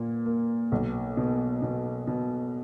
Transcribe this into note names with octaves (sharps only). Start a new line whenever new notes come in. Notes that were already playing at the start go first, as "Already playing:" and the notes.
Already playing: A#2 A#3
A#3
B1
B2
B2
B2